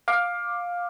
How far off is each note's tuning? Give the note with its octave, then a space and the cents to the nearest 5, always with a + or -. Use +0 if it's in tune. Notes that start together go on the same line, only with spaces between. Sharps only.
F5 +15 D6 +5